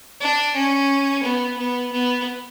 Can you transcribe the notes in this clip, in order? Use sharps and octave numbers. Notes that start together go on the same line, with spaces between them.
D4
C#4
B3
B3
B3